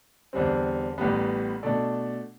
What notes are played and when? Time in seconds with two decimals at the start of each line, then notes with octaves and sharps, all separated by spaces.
0.33 E2 D3 G3 C4
0.98 A1 A2 G3 B3
1.63 B2 A3 D4 A4 D5